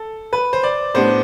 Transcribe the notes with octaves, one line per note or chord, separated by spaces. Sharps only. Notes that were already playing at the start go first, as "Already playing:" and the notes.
Already playing: A4
B4
C5
D5
A2 G3 B3 D4 C5